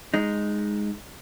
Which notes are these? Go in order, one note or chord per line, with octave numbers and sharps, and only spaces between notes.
G#3 D#4